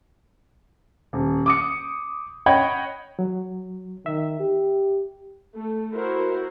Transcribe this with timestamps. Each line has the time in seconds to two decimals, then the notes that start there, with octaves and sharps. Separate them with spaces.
1.13 D#1
1.46 D6 D#6 C#7
2.46 C#5 D#5 F#5 G5 B5 G#6
3.19 F#3
4.06 D#3 E5
4.39 G4
5.56 A3
5.93 E4 F#4 A#4 C5